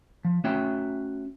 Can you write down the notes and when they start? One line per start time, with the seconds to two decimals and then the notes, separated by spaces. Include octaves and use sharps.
0.25 F3
0.44 A3 C#4 F#4 C#5 E5 G5